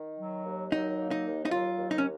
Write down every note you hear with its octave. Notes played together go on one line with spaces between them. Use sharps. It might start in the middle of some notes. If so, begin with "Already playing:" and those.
Already playing: D#3
F#3
D#2
F#3 D#4
A#3
D#4
D#2
D#4
F#3 F4
D#2
D#4
C#4